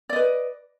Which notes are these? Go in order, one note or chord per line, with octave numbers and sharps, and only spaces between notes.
B4 D5 D#5